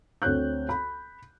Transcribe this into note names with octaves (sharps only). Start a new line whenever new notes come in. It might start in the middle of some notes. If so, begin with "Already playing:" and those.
D2 C4 C#5 F#6 G6
B5